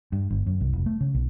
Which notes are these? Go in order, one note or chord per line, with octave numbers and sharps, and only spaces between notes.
G2
G1
F#2
C2
F1
A3
C#3
B1